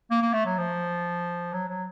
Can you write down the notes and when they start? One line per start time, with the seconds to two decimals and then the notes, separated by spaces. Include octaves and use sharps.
0.11 A#3
0.22 A#3
0.33 A3
0.46 F#3
0.58 F3
1.53 F#3
1.68 F#3